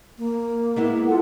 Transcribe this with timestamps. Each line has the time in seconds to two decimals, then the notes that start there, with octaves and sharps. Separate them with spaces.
0.18 A#3
0.76 G#3 B3 E4
1.07 F4 A4 F#5